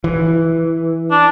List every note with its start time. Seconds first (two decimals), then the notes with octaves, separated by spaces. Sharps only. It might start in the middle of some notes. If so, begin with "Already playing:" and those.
0.04 E3
1.11 D4